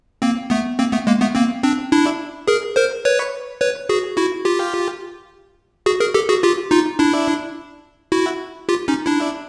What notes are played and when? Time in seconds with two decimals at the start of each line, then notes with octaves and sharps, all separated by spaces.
0.22 A#3 C4
0.50 A3 B3
0.79 A#3 C4
0.92 A3 B3
1.07 G#3 A#3
1.21 A3 B3
1.35 A#3 C4
1.64 C4 D4
1.91 D4 E4
2.48 G#4 A#4
2.76 A#4 C5
3.05 B4 C#5
3.61 B4 C#5
3.89 F#4 G#4
4.17 E4 F#4
4.45 F4 G4
5.86 F#4 G#4
6.00 G#4 A#4
6.14 G4 A4
6.29 F#4 G#4
6.43 F4 G4
6.71 D#4 F4
6.99 D4 E4
8.12 E4 F#4
8.69 F4 G4
8.88 C#4 D#4
9.06 D4 E4